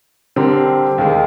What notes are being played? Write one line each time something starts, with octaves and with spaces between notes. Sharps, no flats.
D3 G3 C4 G4 A#4
D#2 D#3 G#3